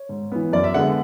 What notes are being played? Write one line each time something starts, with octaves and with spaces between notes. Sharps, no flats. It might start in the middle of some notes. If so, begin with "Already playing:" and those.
Already playing: C#5
G#2
E3 B3
F#2 D5
E5
D3 G#3 B3 F#5